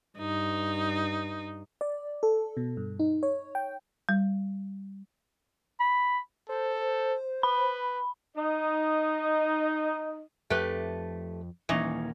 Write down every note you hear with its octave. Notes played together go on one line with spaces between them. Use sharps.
G2 D#4
D5
A4
B2
G2
D#4
C#5
G5
G3
B5
A4 C5
B4 B5
D#4 D#5
F2 A3 G4 B4
D#1 E3 A#3 C#4 D#4